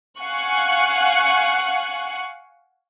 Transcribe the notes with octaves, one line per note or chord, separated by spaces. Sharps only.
F5 F#5 G#5 C#6 F#6